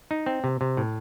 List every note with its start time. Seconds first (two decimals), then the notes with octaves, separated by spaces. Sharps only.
0.11 D#4
0.26 C4
0.44 C3
0.61 C3
0.77 A2